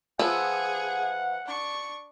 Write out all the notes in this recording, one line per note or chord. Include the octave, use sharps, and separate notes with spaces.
F3 B3 G#4 E5 F#5
D4 C#6